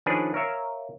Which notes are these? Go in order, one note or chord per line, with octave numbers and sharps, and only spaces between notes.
D#3 F3 C#4 D4 G#4 B4
A#4 C#5 E5 F5